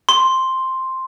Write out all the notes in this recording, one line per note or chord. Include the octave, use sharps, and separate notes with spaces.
C6